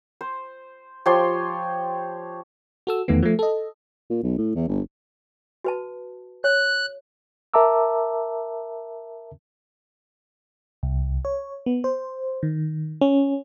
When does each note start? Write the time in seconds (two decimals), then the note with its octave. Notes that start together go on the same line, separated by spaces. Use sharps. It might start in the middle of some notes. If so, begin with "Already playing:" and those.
0.21 C5
1.06 F3 G4 C#5 C6
2.87 F#4 A4 E6
3.08 E2 D#3 A3 B3
3.23 F3 A3
3.39 A4 D#5
4.10 A#2
4.23 B1
4.38 A2
4.55 E2
4.68 G1
5.64 F#4 B4 A5
6.44 C#5 F#6
7.54 A#4 E5 A5 A#5 D6 E6
10.83 C2
11.25 C#5
11.66 B3
11.84 C5
12.43 D#3
13.01 C#4